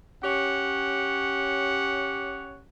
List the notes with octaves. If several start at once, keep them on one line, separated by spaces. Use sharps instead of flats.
C#4 G4 C#5 F#5